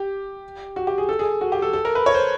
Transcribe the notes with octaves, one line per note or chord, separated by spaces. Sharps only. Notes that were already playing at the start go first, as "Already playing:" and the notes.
Already playing: G4
F#4
G4
G#4
A4
G#4
F#4
G4
A4
A4
A#4
B4
C#5
C5